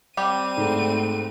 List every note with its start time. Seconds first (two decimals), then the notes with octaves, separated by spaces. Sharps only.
0.17 G3 C4 G4 D#7
0.57 G#2 A3